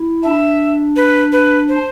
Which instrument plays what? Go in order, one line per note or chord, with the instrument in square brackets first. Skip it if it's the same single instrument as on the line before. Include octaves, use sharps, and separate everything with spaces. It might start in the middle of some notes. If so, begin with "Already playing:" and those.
Already playing: [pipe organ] E4
[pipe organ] D4 [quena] E5
[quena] B4
B4
C5